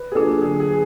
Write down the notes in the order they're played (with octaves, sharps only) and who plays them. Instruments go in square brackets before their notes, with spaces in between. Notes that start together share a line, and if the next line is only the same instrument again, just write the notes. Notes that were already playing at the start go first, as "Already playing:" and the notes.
Already playing: [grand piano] B4
G#4
[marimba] F#3 A#3 D4 F4 [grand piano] A4
[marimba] D3 [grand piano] G#4
[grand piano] G#4
[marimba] F#3